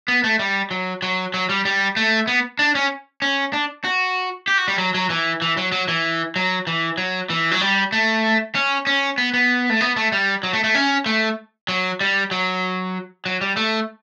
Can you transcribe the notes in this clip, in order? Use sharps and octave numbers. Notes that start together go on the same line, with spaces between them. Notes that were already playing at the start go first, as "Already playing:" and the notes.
B3
A3
G3
F#3
F#3
F#3
G3
G3
A3
B3
D4
C#4
C#4
D4
F#4
G4
F#4
G3
F#3
F#3
E3
E3
F#3
F#3
E3
F#3
E3
F#3
E3
F#3
G3
A3
C#4
C#4
B3
B3
A3
B3
A3
G3
F#3
A3
A3
C#4
A3
F#3
G3
F#3
F#3
G3
A3